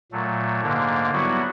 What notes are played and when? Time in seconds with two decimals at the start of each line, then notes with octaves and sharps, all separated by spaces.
0.12 A#2 F#3 A3
0.63 G#2 D3 A#3
1.13 F#3 G3 B3 E4 F#4